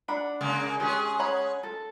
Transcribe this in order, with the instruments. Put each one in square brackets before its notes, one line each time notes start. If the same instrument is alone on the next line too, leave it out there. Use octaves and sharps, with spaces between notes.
[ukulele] D4 F#5 B5
[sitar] C#3 G#3 A#3
[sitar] G#3 C#4 G#4 [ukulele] G4
[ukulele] C#5 F#5 B5
A4